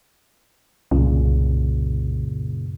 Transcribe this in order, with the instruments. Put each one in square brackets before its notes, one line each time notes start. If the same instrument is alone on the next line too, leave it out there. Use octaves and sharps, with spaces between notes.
[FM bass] C2 [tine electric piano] F#2 A#2 C#3